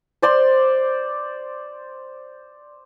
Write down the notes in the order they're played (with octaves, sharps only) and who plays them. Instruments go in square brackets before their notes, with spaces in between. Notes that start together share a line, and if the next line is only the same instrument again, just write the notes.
[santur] C5 D5 C6